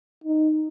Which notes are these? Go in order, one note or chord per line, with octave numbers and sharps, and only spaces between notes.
D#4